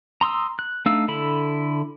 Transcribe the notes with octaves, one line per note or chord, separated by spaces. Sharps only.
A#5 C6 D#6 E6
F#6
A3 D4 D#4 F5 E6
D3 E4 A4 B5